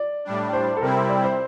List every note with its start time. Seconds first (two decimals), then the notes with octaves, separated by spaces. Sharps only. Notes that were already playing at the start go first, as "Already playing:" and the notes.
Already playing: D5
0.25 A2 G3 D4
0.53 C5
0.77 A4
0.81 C3 G3 C4 E4 A#4
1.09 D5
1.24 C5